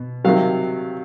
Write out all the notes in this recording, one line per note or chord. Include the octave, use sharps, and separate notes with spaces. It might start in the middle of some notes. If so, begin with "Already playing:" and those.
Already playing: B2
C3 D#3 F#3 F5